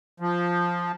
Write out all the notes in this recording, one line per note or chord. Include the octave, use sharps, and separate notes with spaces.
F3